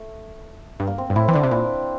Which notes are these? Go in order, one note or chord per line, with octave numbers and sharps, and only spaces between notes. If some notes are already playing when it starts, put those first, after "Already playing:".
Already playing: A3
G2
A#3
C4
G2
A2 E4
E3 C4
D3 D4
C3
A#2 E4